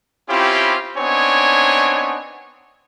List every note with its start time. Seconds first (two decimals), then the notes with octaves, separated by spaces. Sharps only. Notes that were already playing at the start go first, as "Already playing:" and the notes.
0.29 C4 C#4 E4 F4 G4
0.97 B3 C4 D4 D#4 C#5 G#5